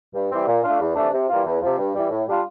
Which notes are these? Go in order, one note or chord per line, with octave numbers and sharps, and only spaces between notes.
G2
E3 G3 C4
A#2
A3 D4 F4
E2
C3 E3 A3 D4
C3
E3 G3 A#3 F4
E2
C3 F3
G2
E3 G3
A2
G3 D4 F4